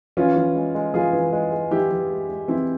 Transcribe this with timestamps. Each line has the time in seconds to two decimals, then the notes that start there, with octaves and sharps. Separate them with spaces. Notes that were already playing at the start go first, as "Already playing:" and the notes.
0.17 E3 C#4 F4
0.36 E3
0.55 G#3
0.75 G#3
0.94 E3 F4 G#4
1.13 E3
1.32 G#3
1.52 G#3
1.71 E3 E4 G4
1.91 E3
2.10 G#3
2.29 G#3
2.48 E3 C4 E4